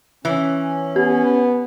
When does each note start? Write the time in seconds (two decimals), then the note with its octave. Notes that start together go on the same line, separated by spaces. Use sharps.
0.25 E3 C#4
0.96 B3 G4